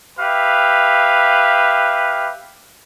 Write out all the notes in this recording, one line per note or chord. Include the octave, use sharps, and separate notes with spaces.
G4 B4 E5 F5